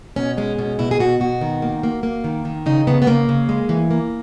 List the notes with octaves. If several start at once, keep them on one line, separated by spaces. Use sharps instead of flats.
B2 C#4
G#3 C#4
B2 C#4
B2 E4
G#4
B2 F#4
B2 F#4
D#3
A#3
A#3
A#3
D#3
D#3
C#3 D#4
C#3 B3
B3
C#3 A#3
C#3
G#3
E3
A#3